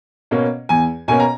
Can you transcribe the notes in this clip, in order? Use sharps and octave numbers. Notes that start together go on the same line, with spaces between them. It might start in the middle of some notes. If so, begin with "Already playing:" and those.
B2 A#3 C#4
E2 G#5
B2 A#3 C#4 G#5
A#5